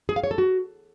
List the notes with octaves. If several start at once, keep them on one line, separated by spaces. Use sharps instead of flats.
G#4
F5
C#5
A4
F#4